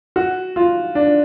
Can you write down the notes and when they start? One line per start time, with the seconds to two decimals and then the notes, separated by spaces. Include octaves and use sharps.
0.16 F#4
0.56 F4
0.95 D4